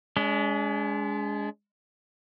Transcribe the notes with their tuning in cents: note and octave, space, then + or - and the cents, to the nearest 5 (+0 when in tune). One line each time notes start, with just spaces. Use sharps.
G#3 +0 D4 -45